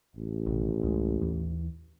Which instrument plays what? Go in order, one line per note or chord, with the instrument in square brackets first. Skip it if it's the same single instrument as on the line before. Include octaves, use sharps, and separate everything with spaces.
[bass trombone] A1
[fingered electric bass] A#1 B2 D#3
C#2 G#3
D#2 E3